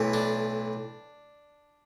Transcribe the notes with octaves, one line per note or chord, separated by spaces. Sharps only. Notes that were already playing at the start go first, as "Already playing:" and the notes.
Already playing: B1 A2 E3
D4